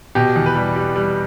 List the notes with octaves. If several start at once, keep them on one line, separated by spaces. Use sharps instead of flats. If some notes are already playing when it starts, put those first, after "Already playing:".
B2 G4
E2
B4
G3
G3
G3